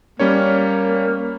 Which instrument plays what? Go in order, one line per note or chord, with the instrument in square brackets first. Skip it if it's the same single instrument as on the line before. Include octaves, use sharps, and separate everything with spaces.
[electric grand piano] G3 C#4 C#5 [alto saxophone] A#3